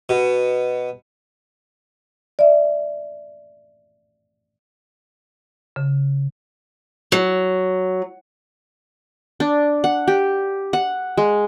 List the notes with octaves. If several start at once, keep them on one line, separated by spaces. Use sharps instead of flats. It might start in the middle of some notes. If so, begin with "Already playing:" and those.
B2
D5 E5
C#3
F#3
D4
F#5
G4
F#5
G#3